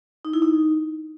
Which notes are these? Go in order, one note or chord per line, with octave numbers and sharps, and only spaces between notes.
D#4
E4
D#4